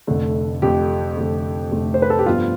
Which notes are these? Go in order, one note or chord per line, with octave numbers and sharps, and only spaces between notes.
F1 F2 D3 A3
F1 F2 D3 A3 G4
F1 F2 D3 A3
F1 F2 D3 A3
C5
B4
A4
G4
G2 F3 B3 F4